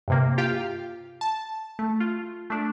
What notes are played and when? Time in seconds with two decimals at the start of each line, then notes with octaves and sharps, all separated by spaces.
0.08 G2 C3 A#3
0.38 F4 G4 F5 G5
1.21 A5
1.79 A3
2.00 F4
2.50 A3 D4